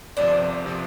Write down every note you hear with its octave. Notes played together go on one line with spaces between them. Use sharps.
G1 F2 C3 F3 D4
C3 F3